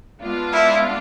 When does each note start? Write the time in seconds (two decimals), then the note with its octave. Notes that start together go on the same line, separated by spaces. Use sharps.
0.22 G#3 B3 D4 F4
0.53 E4